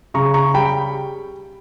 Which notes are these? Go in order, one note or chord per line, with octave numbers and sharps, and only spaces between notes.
C#3 A#5 C#6
A#5 C#6
G3 G5 B5